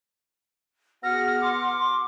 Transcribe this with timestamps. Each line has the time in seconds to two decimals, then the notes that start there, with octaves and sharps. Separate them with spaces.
1.03 B3 F#4 G#4 F#5 F6 A#6
1.40 C6 D6